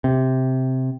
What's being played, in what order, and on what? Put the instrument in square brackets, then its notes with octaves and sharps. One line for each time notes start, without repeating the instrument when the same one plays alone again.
[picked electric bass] C3